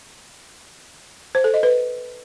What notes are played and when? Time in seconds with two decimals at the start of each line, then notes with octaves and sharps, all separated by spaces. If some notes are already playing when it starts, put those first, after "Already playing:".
1.35 C5
1.44 A4
1.54 D#5
1.63 B4